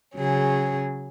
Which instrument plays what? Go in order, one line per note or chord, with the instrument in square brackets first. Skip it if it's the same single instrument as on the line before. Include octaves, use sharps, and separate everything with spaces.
[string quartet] C#3 F#3 C#4 G#4